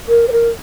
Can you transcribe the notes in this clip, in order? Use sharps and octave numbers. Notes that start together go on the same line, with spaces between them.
A#4
C5
A#4